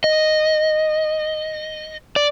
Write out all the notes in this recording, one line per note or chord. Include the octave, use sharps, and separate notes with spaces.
D#5
D5